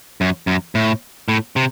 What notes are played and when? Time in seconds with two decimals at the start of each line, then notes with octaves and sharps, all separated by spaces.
0.21 F#2
0.47 F#2
0.75 A2
1.28 A2
1.56 C3